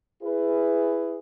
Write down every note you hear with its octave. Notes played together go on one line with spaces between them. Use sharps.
E4 G#4 B4